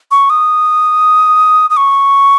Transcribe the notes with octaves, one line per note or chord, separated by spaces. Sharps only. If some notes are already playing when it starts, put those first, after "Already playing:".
C#6
D#6
D#6
C#6